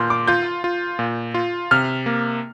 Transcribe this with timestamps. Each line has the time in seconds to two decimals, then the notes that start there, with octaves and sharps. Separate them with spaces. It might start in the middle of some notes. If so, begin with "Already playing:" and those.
Already playing: A#2 C6 F6 G6
0.10 D6
0.27 F4 G6
0.64 F4
0.99 A#2
1.34 F4
1.71 C3 F6
2.06 A#3